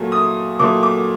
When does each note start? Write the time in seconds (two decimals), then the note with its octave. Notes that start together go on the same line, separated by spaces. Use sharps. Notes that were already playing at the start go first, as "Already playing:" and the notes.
Already playing: A#2 F#3 A3
0.12 D#6
0.60 A#2 F#3 A3 D6
0.83 D6